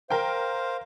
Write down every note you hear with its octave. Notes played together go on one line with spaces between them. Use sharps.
A#4 C5 F5 G5